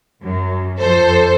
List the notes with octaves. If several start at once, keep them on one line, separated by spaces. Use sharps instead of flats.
F#2
F2 A4 C5